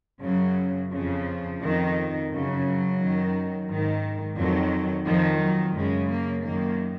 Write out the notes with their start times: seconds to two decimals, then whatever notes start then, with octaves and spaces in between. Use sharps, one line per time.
0.23 F#2 C#3 F#3
0.92 F2 C#3 F3
1.61 F2 D#3
2.30 F#2 C#3 F#3
2.99 F#2 D#3
3.68 G#2 D#3
4.37 F2 D#3 F#3
5.06 F2 D#3 F3
5.41 F#3
5.75 F#2 C#3 G#3
6.10 A#3
6.45 F#2 D#3 A#3